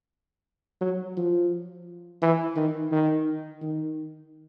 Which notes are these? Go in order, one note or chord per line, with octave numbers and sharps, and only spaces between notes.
F#3
F3
E3
D#3
D#3
D#3